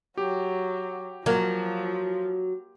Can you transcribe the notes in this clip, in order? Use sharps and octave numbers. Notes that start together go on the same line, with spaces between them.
F#3 G4
F3 F#3 A#3